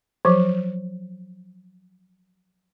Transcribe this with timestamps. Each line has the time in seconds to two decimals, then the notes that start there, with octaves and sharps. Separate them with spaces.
0.25 F3 F#3